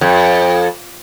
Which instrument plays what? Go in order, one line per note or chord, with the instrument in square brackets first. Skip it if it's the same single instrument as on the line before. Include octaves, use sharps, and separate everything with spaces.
[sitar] F2